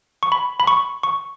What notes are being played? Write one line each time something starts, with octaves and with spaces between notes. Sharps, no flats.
C#6
B5
B5
C#6
C#6